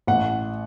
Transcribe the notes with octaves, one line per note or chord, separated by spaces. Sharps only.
A1 F#5